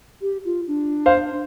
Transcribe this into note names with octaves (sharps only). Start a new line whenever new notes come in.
G4
F4
D4
C5 F5